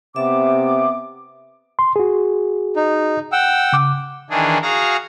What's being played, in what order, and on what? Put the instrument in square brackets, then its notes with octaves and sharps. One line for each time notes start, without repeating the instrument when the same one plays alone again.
[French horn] C3 [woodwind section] B3 D6 [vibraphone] E5
[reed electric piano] C6
F#4 G#4
[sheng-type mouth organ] D#4
F#5 G5 E6
[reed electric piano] C#3 D6
[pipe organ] D#3 E3 D4 G#4
F#4 G#4 F5 A#5